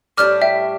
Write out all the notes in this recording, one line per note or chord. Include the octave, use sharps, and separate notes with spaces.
A2 G3 D4 D6 F6
E5 G5